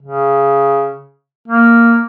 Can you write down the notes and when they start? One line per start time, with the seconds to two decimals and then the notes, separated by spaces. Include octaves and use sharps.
0.03 C#3
1.48 A#3